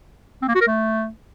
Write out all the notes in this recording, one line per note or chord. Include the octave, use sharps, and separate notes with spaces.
C4
A#3
F#4
A#4
A3